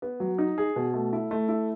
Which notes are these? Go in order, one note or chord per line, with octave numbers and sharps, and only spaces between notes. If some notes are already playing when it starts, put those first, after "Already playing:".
B3
F#3
D#4
G#4
B2
A3
E4
A3
E4